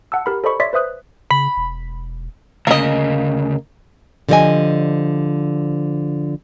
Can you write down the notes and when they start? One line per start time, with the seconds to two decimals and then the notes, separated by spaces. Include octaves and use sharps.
0.12 F#5 A5 E6
0.26 G4 A#4 B5
0.44 A4 C5 D5 D#5 B5 C#6
0.60 C#5 D5 E5 C6 B6
0.73 B4 C5 E5 D#6 F#6
1.31 C#3 B5
1.56 E1
2.67 D2 C#3 A#3 D#5
4.29 D3 F3 G3 C#5 D#5 G#5